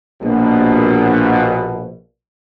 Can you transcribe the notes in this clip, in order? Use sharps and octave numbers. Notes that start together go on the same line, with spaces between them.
A#1 B2